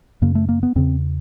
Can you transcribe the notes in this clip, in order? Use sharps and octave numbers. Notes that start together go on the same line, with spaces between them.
F#2 C#3 A#3
A3
A#3
B3
E2 C#3 C4